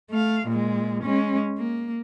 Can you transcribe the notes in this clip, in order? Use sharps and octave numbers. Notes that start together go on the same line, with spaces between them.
A3 F5
A#2 G#3
G#3 C#4
A#3